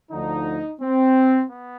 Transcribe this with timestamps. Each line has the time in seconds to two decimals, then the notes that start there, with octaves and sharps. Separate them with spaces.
0.11 D2 D3 F3 D#4
0.81 C4
1.48 B3